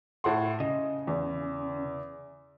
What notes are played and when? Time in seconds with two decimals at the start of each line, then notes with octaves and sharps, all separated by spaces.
0.24 A2 F#5 C6
0.60 C#3 D#5
1.07 E2